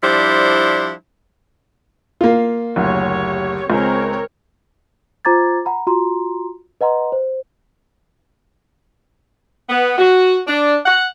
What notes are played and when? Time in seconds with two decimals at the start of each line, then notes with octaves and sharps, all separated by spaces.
0.03 F3 G3 D4 E4 C5
2.21 A#3 F4
2.76 F#1 D2 G4 C#5
3.70 C#2 G#3 C4 A#4 C#5
5.25 F4 C5 A#5 D6 G#6 A6
5.65 F#5 A#5 B5
5.87 F4 F#4 A#5 C6
6.81 B4 D#5 F#5 A#5 C6
7.12 C5
9.69 B3
9.98 F#4
10.48 D4
10.86 F#5